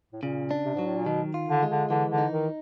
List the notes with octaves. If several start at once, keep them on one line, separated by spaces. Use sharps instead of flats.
A2
A#2 C#3
D4
C3
G#2 F#3
A2
A#2
B2 D#3
F4
D3
G#3
D3
D3 E3
D3
D#4
D#3